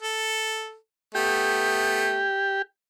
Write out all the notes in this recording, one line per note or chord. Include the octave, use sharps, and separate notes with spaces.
A4
A3 B3 G4